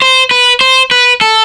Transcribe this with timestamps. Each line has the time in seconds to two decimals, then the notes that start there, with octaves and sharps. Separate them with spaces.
0.02 C5
0.31 B4
0.61 C5
0.91 B4
1.21 A4